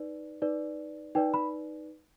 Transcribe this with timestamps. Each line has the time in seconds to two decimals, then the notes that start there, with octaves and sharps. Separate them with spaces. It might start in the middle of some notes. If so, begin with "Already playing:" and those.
Already playing: D#4 B4 D5
0.42 D#4 B4 D5
1.15 D#4 B4 D5 G5
1.34 B5